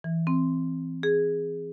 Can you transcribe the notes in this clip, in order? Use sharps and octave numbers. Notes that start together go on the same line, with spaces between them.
E3
C4
G#4